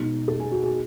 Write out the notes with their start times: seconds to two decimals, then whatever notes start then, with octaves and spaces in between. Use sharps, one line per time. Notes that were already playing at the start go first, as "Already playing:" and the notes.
Already playing: B2 G#3 D#4
0.28 A4
0.40 G#4
0.52 F#4
0.63 G#4